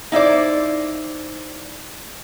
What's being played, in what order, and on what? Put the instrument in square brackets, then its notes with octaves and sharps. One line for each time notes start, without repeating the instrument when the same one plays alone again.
[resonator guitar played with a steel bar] D#4 E4 C5 D5